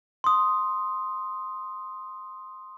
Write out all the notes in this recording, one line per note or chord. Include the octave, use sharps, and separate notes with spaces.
C6 D#6